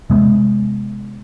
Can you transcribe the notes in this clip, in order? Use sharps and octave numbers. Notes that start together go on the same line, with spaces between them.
C3 G#3 B3